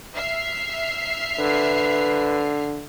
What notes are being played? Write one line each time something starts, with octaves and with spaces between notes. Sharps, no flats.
E5 F6 C7
D3 B4